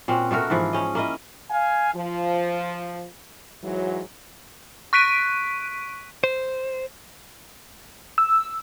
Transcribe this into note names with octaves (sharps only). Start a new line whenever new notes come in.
A#2 C4 C#4 F#4
B2 A3 F#4 A#4
G#2 E3 F3 E4
C#4 D#5
A#3 E4 D#5
F5 G#5
F3
G#2 E3 F#3
C#6 F#6 B6 D7 D#7
C5
E6